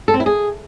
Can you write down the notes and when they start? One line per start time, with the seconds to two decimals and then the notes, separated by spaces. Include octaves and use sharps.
0.08 A4
0.14 C4
0.20 E4
0.26 G#4